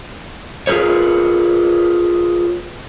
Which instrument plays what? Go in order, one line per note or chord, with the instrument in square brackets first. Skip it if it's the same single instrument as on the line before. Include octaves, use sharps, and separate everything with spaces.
[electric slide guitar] F4 G#4 A#4 B4 C#5